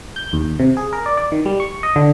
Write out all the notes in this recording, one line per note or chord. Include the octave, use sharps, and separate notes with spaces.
G6
D#2
C3
G#4
A#4
D5
D5
D#3
G3
C#6
D#5
D3